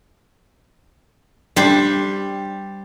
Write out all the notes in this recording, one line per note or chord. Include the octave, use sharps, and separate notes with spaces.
G3 D4 G4 C5